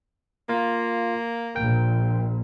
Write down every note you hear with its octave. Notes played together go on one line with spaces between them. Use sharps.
A#3 F4
A#1 A#2 A#4 G5